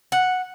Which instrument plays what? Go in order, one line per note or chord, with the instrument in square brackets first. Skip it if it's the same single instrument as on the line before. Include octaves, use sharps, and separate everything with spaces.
[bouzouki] F#5